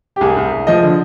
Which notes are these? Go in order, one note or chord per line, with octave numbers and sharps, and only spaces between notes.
G4
C2 G#4
C2
C2
F3 D#5
D3